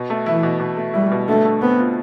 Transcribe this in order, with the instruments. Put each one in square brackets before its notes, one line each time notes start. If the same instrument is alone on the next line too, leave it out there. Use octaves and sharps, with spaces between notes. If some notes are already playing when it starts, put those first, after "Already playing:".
Already playing: [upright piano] B2
A3
[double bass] E3 [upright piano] E4
[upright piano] B2
B2
A3
[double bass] G3 [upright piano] E4
[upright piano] B2
[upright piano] D3 [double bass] A3
[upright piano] A3
[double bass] B3 [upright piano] C4
[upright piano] F4